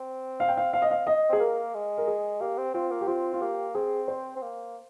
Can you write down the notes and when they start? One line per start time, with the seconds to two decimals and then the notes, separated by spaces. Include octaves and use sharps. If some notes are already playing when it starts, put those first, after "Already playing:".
Already playing: C4
0.40 F5
0.48 G5
0.57 F5
0.73 F5
0.82 D#5
0.91 F5
1.07 D#5
1.29 C4 G#4
1.40 A#3 A#4
1.74 G#3
1.98 A#4
2.07 G#4
2.40 A#3 G4
2.58 C4
2.74 C4 F4
2.91 A#3
3.01 G4
3.07 C4 F4
3.33 F4
3.41 A#3 G4
3.75 C4 G#4
4.08 C5
4.36 C4
4.42 A#3